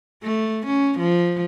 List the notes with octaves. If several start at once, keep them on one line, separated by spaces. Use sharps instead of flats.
A3
C#4
F3